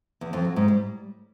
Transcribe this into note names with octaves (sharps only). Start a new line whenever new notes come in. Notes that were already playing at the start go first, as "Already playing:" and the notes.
E2
F2
F#3
G#2
G3